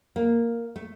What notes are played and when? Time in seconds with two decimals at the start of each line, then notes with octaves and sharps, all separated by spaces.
0.16 A#3
0.76 A3